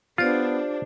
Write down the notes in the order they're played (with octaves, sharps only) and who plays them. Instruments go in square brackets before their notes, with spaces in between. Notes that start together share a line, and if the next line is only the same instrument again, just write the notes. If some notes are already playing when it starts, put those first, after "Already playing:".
[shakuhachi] B3 [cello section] D4 [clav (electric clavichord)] F4 [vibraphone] G4 C5 D5